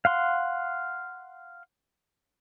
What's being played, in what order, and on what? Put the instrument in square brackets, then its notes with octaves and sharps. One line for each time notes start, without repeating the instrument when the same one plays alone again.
[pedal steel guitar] F5 F#5 C6